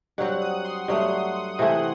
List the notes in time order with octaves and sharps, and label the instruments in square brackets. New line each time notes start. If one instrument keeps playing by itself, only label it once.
[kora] G2 F#3 C4 [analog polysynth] F#5
[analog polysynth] D#6
C6
[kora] G2 F#3 A3 [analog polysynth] D#6
[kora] C3 E3 A3 E4